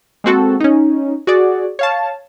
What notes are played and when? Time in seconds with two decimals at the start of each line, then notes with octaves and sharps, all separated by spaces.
0.24 G#3 A#3 C4 F#4 A4
0.60 C#4 D#4
1.27 F#4 G#4 D5
1.79 C#5 F5 A5